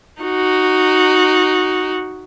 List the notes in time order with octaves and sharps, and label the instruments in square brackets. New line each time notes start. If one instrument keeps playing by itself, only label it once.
[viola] D#4 F#4